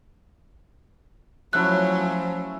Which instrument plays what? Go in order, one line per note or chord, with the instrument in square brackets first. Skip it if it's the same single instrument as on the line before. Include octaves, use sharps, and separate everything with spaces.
[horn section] F3 [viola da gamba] F#3 [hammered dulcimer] A3 C#4 E4 [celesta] F#6